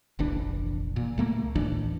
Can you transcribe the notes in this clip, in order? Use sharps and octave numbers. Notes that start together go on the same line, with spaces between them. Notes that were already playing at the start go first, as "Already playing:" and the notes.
F1 A#1 E3 D4
A#2
C#2 A3 A#3
A1 D#2 E3 D4